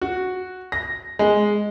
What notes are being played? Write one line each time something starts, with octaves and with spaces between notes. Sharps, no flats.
F#4
A#6
G#3